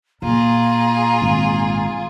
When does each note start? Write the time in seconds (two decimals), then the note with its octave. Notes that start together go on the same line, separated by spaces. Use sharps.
0.22 A#2 F4 G#4 A#5
1.22 G#1